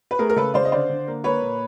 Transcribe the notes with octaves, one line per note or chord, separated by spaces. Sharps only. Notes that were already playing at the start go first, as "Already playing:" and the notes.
B4
A3 G#4 A#4
A#4
C#3 A4 B4
C#3 C5 D5
D#5
D3 C5 D5
D3
A#3
A#3 B4 C#5
A#2